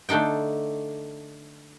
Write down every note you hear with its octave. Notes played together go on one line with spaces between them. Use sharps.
D3 A3 D4 D#4 G5